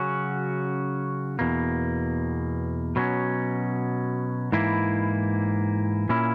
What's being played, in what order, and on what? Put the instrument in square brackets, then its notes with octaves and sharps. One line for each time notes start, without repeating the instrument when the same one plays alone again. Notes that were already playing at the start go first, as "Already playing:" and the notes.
Already playing: [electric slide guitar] C#3 F#3 C#4 F#4
E2 B2 A#3
B2 F#3 C#4
G#2 E3 A#3 E4
A#2 A#3 C#4 E4